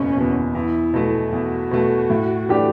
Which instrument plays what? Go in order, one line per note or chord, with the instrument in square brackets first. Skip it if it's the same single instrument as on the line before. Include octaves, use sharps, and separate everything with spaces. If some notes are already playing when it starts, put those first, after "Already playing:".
Already playing: [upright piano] F#1 E2 B2 [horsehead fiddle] C#4
[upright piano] E2 B2
[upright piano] E2 [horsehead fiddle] E4
[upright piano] B2 A3
[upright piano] E2 [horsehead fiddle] F#4
[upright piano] B2 A3
A2
E3 A3 D4 G4